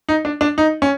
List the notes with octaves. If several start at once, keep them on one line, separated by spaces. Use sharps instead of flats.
D#4
D4
D4
D#4
C#4